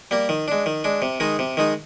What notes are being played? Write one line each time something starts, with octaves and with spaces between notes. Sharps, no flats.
G3 A#3
D#3
G#3 D4
D#3
G#3 D4
C3
D#3 G#3 D#4
C3
D#3 G#3 D#4